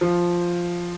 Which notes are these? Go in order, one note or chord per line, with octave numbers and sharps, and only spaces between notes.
F3